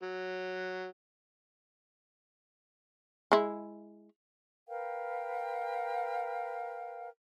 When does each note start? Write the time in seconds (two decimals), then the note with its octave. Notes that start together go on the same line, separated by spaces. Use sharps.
0.02 F#3
3.32 G#3 E4
4.67 A#4 B4 F5 G5